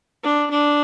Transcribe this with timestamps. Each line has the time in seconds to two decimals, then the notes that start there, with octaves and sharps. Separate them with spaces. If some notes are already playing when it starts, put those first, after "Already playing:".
0.23 D4
0.51 D4